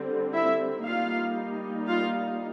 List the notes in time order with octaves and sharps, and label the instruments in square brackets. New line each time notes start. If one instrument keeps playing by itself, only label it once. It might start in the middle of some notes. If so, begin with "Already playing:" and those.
Already playing: [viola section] D3 G3 C4
E4 E5
G3 A#3 D#4 F4 F5
F4 F5